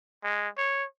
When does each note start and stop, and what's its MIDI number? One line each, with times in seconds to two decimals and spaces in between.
0.23 0.48 56
0.57 0.85 73